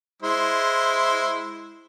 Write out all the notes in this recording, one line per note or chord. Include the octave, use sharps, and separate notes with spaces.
G#3 E4 C5